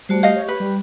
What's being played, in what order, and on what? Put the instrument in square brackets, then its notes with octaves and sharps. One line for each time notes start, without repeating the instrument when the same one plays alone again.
[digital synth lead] G3 [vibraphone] A3 F#4 C5
[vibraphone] G4 [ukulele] D#5 F5
[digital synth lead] C#5
[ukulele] B4
[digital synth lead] G3